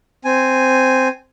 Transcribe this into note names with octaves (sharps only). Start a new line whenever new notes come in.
C4 G#5